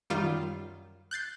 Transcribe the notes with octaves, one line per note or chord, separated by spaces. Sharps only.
F#2 D#3 G3 F4
F#6 G6 A6 C7